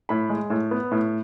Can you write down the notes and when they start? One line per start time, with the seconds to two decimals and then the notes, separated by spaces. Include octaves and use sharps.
0.09 A2 B5
0.29 G#3
0.50 A2
0.71 B3
0.91 A2